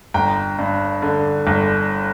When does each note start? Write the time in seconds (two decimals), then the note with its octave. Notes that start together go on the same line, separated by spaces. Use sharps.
0.14 G1 G5 A#5
0.59 G2
1.02 D3
1.47 G1